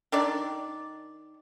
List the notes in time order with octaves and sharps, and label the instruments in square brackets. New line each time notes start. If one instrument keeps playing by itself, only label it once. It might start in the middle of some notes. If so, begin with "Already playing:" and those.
[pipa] D#3 D4 D5